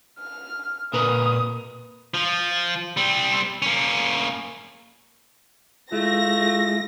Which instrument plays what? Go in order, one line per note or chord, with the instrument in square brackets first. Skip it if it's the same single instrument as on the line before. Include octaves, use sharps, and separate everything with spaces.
[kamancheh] F6
[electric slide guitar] A#2 A#4 B4 [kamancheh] D#6
[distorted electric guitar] F3
G3 C4
A#3 C#4
[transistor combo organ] G#3 E4 [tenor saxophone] A3 [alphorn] F4 [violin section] A#6